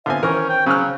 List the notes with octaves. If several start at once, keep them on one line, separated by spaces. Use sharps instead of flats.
D3 B3 C4 F4 E5 G#5
D#3 E3 C#4 A#4 C5
G5
C#3 F#3 F6